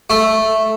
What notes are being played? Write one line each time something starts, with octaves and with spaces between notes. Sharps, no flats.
A3